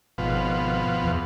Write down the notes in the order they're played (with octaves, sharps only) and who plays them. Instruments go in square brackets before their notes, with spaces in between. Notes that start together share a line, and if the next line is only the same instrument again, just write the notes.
[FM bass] G#1 [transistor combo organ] B2 F3
[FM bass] E2